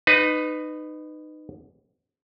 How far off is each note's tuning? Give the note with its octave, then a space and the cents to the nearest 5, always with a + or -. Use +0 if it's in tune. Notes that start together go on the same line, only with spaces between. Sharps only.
D#4 -20 B4 +15